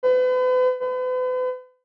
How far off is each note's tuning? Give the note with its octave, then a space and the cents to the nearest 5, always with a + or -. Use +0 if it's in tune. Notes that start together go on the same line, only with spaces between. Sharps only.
B4 +40
B4 +40